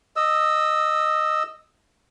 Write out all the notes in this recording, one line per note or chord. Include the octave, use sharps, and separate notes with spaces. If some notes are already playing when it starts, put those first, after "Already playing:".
D#5 E6